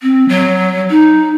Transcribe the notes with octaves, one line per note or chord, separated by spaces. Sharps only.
C4
F#3
D#4